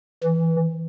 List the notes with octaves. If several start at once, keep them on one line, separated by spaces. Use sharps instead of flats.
E3